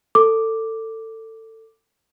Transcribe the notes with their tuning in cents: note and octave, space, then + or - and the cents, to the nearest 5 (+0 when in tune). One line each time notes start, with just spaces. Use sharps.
A4 +20 D6 +0